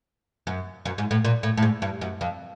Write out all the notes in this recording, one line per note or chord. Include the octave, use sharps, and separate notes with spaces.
F#2
F#2
G#2
A2
A#2
A2
A2
G#2
G2
F#2
F2